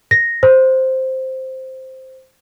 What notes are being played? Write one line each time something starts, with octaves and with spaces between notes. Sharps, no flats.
A#6
C5